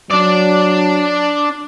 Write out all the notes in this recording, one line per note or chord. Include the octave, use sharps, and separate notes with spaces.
F#3 D4 D5